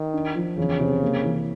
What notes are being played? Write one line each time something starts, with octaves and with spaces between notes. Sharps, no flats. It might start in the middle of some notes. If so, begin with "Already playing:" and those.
Already playing: D#3
D4
F3
E2 C#3
C3
A#3
E3